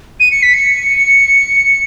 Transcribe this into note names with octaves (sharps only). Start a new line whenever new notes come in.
D#7
C#7
B6
C#7